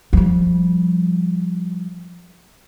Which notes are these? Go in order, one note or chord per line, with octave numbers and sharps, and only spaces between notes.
F3 G3